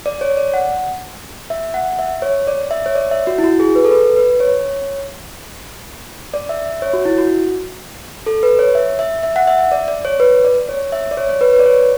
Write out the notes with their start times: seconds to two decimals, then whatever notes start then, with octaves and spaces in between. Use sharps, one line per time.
0.06 D5
0.21 C#5
0.37 D5
0.54 F#5
1.50 E5
1.74 F#5
1.99 E5
2.22 C#5
2.47 D5
2.71 E5
2.86 C#5
2.95 D5
3.11 E5
3.27 F#4
3.38 E4
3.44 F#4
3.60 G#4
3.75 B4
3.85 A4
3.91 B4
4.16 B4
4.40 C#5
6.34 D5
6.49 E5
6.66 E5
6.82 C#5
6.93 F#4
7.05 E4
7.18 F#4
8.26 A4
8.43 B4
8.59 C#5
8.75 E5
8.99 E5
9.23 E5
9.36 F#5
9.48 E5
9.59 E5
9.72 D5
9.88 D5
10.05 C#5
10.20 B4
10.45 D5
10.69 C#5
10.92 E5
11.11 D5
11.17 C#5
11.29 C#5
11.41 B4
11.53 B4
11.59 D5
11.66 C#5